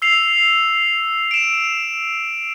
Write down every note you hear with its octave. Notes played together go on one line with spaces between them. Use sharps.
E6 C7 F7
D7 E7